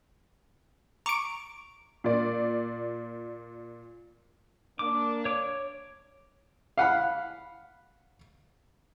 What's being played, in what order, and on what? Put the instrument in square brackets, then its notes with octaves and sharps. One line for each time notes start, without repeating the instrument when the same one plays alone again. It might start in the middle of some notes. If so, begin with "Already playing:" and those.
[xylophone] A#5 D6 [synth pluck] C#6 D7
[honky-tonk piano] A#2 D5
[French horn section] A#3 D4 [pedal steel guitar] D6
[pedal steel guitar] C#5 D6
[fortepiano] F5 F#5 B5